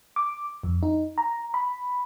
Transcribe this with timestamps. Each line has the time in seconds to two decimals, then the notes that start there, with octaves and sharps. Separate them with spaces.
0.16 D6
0.63 F2
0.83 D#4
1.18 A#5
1.54 B5